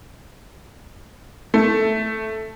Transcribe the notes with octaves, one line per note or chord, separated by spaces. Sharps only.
A3